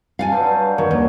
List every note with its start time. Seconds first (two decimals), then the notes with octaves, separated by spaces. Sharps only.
0.19 F5 F#5 G#5 A5
0.32 G2 F#3 G3
0.78 D#3 C#5
0.91 D#2